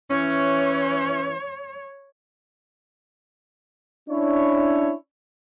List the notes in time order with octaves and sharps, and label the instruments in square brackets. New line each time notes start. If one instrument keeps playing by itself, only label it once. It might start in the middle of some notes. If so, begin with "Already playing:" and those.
[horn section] E3 C#4 [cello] C#5
[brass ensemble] C#4 D4 E4 C#5